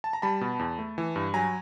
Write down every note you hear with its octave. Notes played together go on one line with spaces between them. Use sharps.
A5
A#5
G3 A5 B5
B2
E2
A3
E3
G2
F#3 G#5 A#5